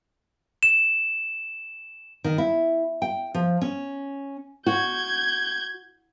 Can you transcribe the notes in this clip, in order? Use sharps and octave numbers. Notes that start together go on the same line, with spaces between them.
E7
D#3
E4
G5
F3
C#4
F#4 G6 G#6